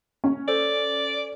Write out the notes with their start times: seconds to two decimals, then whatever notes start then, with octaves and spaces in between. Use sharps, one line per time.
0.24 C#4
0.48 A4 C5 D5